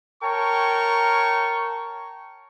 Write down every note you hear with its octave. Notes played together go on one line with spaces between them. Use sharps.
A#4 C#5 G5 A5 C#6